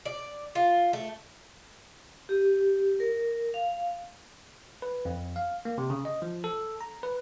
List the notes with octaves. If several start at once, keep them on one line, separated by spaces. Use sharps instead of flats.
D5
F4
A3
G4
A#4
F5
B4
F2
F5
A#3
C3
C#3
D#5
F3
A4
A#5
B4